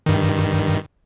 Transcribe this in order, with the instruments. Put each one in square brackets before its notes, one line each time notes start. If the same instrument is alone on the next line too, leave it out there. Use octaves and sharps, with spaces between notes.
[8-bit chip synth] G2 D#3